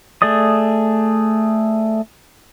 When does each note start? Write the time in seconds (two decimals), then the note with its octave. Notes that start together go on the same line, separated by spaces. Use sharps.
0.22 A3 G#4 D5 D#6